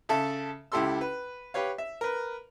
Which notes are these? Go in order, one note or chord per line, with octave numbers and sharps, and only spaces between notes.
C#3 A4 E5 A5
C#2 E4 G4 A4 C6 E6
B4
G4 B4 C#5 F5
E5
A#4 B4